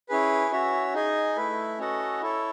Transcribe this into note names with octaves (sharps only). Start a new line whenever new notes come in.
C#4 E4 G#4 B4
C#4 F#4 C#5 E5
D#4 G#4 D#5 G#5
A3 E4 B4
C#4 F#4 A4 D#5 F#5
E4 A4 C#5